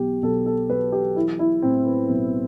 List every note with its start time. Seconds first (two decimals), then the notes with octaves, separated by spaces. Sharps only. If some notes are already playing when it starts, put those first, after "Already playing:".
Already playing: B1 B2 G4
0.22 B1 A4
0.46 A4
0.70 F#3 B4
0.92 G4
1.16 E3 E4
1.39 E4
1.62 A2 C4
1.86 B3
2.09 B1